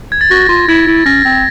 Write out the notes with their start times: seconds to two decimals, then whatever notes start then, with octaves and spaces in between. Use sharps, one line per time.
0.12 G#6
0.21 A6
0.31 F#4 A#6
0.49 F4
0.68 E4 G#6
0.87 E4
1.06 C#4 A#6
1.25 C4